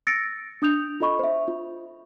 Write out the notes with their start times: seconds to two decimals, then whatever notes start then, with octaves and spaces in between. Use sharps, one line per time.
0.07 E6 A6 A#6 C#7 D7
0.62 D4 D#6 G6 F7
1.00 F4 A4 D#5 B5 C#6
1.19 C5 E5
1.48 F4